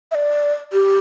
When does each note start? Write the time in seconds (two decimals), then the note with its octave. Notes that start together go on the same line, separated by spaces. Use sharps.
0.11 E5
0.15 D5
0.73 G4